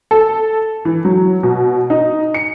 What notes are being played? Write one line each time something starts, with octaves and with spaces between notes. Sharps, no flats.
A4
E3
F#3
B2
D#4
C#7